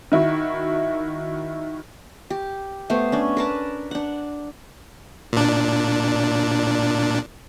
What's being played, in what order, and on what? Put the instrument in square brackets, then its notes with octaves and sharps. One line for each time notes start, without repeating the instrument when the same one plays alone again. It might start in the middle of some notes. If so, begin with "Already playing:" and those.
[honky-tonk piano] D#3 E4 F#4
[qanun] G4
A3 B3 C5
C#4 D4
A#4 B4 A5
D4 F#5
[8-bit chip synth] A#2 D4